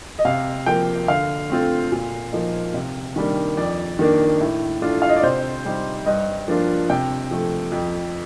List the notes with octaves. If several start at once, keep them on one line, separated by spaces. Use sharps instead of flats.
D#5
C3 F5
F3 A#3 G5
D3 F5
A3 C4 F4
A#2
F3 A#3 D#4
C3
D#3 G3 A#3 D4
F2 D5
D#3 A#3 D4
A2
A3 D4 F4
F5
D#5
D5
C3 C5
G3 C4 D#4
G2 D#5
F3 A#3 D4 F4
C3 G5
F3 A3
F2